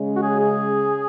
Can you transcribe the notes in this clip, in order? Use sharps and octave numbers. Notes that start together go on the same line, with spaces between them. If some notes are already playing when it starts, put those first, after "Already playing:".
Already playing: C#3 G#3 C#4
F#4
G#4
G#4